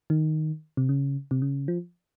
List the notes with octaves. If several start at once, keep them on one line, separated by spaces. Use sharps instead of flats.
D#3
C3
C#3
C3
C#3
F3